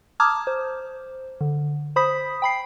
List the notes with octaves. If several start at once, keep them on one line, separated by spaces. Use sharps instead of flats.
A5 A#5 D6 D#6 F6 G#6
C5
D3
C5 B5 D#6 B6
G5 B5 C7